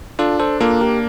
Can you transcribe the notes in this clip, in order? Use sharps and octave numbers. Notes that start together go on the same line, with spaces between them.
D4 F4 A4
A4 C5
A#3 F4 A4
G4 A#4